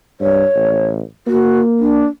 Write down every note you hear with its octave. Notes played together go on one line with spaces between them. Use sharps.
G2 C#5
A1
A#3 F#4
D4